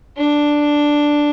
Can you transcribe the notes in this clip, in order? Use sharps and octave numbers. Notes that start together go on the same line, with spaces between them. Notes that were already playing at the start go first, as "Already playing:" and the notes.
D4